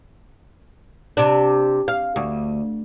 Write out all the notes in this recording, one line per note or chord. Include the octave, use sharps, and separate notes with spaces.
C3 D4
F5
D2